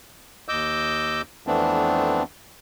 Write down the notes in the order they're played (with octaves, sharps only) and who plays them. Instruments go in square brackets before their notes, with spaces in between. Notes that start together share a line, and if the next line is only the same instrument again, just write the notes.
[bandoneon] D#2 D#5 D6 E6 G6
F2 E3 A3 B3 C4 D4